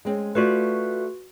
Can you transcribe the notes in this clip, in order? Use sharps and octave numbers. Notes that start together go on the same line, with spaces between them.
G#3 C4 C#4
A3 F4 F#4 B4 D5